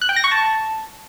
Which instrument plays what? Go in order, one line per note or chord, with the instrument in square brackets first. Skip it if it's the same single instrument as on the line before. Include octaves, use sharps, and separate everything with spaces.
[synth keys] F#6
G5
A#6
C#6
A5